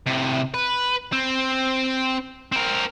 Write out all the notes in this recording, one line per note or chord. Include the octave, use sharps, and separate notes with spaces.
A2 C3
B4
C4
C4 A#4